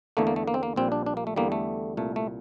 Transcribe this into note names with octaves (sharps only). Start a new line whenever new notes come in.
E2 D3 A3 A#3
A#3
A3
A#3
C4
A#3
A#1 A#2 G3 C4
D4
D4
A#3
A3
E2 D3 G3 A#3
A3
C2 A#2 A3
A3